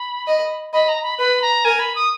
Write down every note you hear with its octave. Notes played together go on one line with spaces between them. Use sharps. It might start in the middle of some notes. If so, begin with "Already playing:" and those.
Already playing: B5
D#5
D#5 B5
A#5
B5
B4 B5
A#5
A#4 G#5
B5
D#6